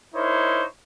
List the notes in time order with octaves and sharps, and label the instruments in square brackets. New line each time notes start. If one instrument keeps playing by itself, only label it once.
[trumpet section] D#4 E4 A#4 C5 C#5